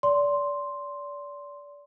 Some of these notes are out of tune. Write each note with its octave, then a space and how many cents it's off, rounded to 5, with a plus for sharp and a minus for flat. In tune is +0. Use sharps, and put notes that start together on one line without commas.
D5 -30 C6 +0